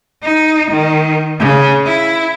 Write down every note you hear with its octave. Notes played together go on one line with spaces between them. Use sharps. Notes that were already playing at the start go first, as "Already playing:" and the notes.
D#4
D#3
C#3
E4